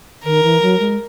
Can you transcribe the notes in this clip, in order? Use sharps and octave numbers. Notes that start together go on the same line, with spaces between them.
D#3 A#4
E3
F#3
G#3